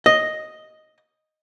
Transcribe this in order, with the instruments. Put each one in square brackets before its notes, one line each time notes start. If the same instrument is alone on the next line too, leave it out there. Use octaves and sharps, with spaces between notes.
[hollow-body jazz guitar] D#5